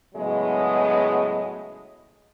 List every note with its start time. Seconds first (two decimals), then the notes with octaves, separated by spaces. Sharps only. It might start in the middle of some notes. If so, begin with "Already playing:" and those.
0.15 A2 C#3 F#3 G#3 B3 D#5